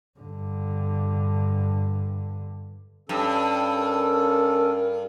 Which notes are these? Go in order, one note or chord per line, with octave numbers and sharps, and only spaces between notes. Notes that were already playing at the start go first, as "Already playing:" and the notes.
G2 D3
G2 C#4 A4
A#4